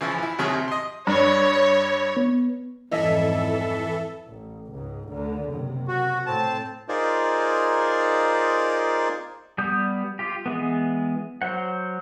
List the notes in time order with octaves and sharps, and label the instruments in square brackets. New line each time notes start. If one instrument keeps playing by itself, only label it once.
[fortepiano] C#3 E3 F3 E4
E3 E4
D#2 C3 F#3 G#4 F6
C3
D#5 C6
[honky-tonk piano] G2 [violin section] C#5
[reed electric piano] B3
[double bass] F2 G#2 [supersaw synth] E3 A4 [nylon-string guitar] G3 C#4 D#5 [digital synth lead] E5
[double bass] A1
C#2 G#2
D2 D3
F#1 C3
[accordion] F#4
[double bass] A2 [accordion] C4 A5
[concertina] D#4 F4 G#4 A#4 C5 D5
[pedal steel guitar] G3 B3 D#6 G6
F4 G4
E3 G#3 B3
F#3 C5 F#5